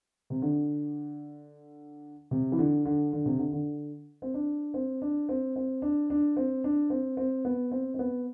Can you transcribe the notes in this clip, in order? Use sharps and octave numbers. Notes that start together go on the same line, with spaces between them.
C3
D3
C3
E3
D3
D3
D3
C3
D3
D3
C4
D4
C4
D4
C4
C4
D4
D4
C4
D4
C4
C4
B3
C4
C4
B3